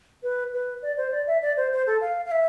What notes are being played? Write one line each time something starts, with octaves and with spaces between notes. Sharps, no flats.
B4
B4
D5
C5
D5
E5
D5
C5
C5
A4
F5
F5
E5